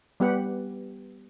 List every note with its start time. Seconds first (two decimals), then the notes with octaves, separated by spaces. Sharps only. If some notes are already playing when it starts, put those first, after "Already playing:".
0.20 G3 B3 G4 B4 F#5